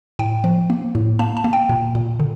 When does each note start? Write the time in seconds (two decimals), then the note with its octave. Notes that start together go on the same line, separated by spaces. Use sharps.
0.19 A2 G5
0.44 F3
0.70 A#3
0.95 A2
1.19 A#3 A5
1.37 A5
1.44 A#3
1.53 G5
1.69 A#2
1.95 A#2
2.20 D3